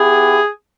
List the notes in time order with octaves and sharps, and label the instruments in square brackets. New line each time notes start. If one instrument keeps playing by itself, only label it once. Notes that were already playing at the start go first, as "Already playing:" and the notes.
Already playing: [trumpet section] B3 E4 G4 G#4